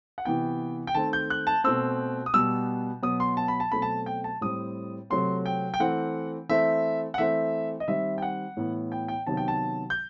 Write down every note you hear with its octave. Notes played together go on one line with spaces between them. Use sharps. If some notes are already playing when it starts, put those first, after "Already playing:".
F#5
C3 E3 B3 G5
G5
D#3 A3 C4 A5
G6
F#6
A5
B2 A3 C4 E6
D#6
B2 G3 B3 E6
B2 F#3 B3 D#6
C6
A5
B5
A5
B2 F#3 A3 C4 B5
A5
G5
A5
A2 G3 C4 D#6
C3 F#3 A3 C4 C6
G5
G5
E3 A3 C4 F#5
E3 A3 C4 E5
F#5
E3 A3 C4 E5
D#5
D#3 G3 C4 E5
G5
F#5
A2 E3 B3
G5
G5
C3 D#3 F#3 B3 A5
G5
A5
G6